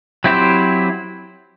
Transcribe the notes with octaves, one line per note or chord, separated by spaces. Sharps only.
F#3 C4 E4 G4 C5